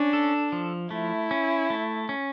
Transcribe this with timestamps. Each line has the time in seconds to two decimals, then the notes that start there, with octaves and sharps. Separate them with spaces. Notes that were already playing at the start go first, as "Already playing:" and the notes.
Already playing: C#4 D4
0.13 A4
0.52 F3
0.91 A3 E4
1.31 C#4
1.70 A3
2.09 C#4